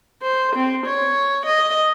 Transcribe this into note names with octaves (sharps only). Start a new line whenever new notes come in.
C5
C4
C#5
D#5